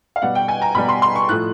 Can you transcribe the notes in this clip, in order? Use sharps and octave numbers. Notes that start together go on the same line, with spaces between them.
F5
B2 G3 F#5
G5
G#5
A#5
B2 G3 B5
C6
C6
C#6
A2 F3 F#6